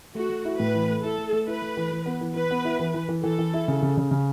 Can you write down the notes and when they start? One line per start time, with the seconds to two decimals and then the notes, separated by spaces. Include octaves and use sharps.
0.15 A3 F#4
0.30 A3
0.45 E4
0.59 A2 B4
0.74 E3
0.89 A3
1.04 E4 A4
1.18 A3
1.33 A3
1.47 E4 B4
1.62 A3
1.77 E3
1.91 E3
2.06 B3
2.21 E3
2.36 E3 B4
2.50 B3
2.65 E4
2.79 E3
2.94 E3
3.09 E3
3.23 E3 A4
3.39 E3
3.54 E4
3.68 C#3
3.82 C#3
3.97 C#3
4.11 C#3